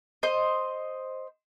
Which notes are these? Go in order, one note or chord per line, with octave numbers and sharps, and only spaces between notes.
C5 D#5